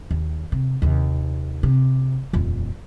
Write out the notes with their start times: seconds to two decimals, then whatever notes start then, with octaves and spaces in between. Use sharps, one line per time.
0.11 D#2
0.52 C3
0.82 D#2 C3
1.63 C3
2.33 D#1 F2